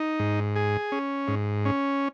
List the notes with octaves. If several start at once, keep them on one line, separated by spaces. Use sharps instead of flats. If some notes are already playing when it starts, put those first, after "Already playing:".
Already playing: D#4
G#2
G#4
C#4
G#2
C#4